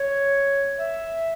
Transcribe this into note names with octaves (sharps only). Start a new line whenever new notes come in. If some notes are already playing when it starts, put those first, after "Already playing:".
Already playing: C#5
E5